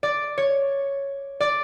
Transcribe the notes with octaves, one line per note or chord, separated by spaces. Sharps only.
D5
C#5
D5